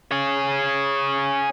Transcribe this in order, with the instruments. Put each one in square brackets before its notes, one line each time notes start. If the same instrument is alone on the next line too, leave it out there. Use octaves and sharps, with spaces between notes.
[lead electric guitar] G#4 C#5